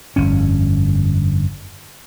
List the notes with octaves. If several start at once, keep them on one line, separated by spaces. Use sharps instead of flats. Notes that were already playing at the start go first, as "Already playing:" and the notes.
G1 F2 C#4